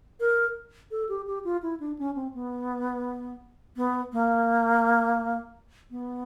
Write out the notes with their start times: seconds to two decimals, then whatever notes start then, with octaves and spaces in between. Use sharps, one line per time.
0.20 A#4
0.91 A4
1.09 G4
1.26 G4
1.44 F4
1.62 E4
1.80 D4
1.98 C#4
2.15 C4
2.34 B3
3.76 B3
4.13 A#3
5.91 B3